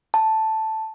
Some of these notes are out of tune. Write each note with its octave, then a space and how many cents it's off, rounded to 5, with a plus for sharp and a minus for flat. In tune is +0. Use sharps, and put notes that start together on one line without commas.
A5 +0